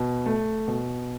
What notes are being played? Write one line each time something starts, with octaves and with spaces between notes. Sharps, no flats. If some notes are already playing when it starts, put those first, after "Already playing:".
Already playing: B2
A3
B2